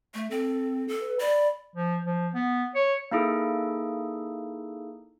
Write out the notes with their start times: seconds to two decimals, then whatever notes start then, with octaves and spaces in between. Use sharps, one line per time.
0.14 A3
0.30 C4 A4
0.88 A4
1.01 B4
1.20 D5 B5
1.76 F3
2.05 F3
2.34 B3
2.75 C#5
3.11 A#3 D#4 E4 G#4 A4